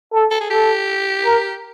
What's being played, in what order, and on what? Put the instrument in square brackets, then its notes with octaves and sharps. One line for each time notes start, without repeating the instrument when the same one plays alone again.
[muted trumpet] A4
[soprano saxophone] A4
G#4
[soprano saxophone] G4 [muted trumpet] A4
[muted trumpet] A#4